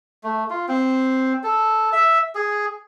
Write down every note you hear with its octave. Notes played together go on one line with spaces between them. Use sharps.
A3
F4
C4
A4
E5
G#4